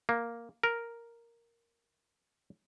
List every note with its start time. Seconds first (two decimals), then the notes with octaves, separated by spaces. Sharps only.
0.09 A#3
0.63 A#4